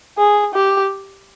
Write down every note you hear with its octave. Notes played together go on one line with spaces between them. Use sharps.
G#4
G4